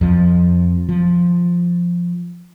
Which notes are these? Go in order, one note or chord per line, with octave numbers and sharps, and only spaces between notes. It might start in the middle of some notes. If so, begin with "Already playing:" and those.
F2 F3
F3